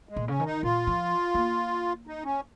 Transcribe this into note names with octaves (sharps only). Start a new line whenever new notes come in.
G#3
A#2
C#3 C#4
D#3
D#4
A#2 F4
F3
A#3
D#4
C#4